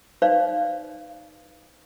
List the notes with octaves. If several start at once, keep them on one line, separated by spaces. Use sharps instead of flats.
D#4 B4 C5 D5 F5